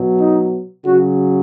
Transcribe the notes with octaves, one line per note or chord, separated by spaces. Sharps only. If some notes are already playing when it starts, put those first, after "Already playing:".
Already playing: B2 F#3
D#4
C#3 F#3 F#4